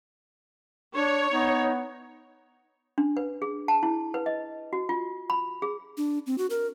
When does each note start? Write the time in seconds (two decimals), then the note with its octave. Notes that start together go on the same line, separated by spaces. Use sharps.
0.95 D4 C#5
1.32 B3 D#4
2.98 D4
3.17 B4
3.42 G#4
3.68 A5
3.83 E4
4.14 B4
4.26 D#5
4.73 F#4
4.89 F4
5.30 B5
5.62 G#4
5.97 D4
6.26 C4
6.38 F#4
6.50 A#4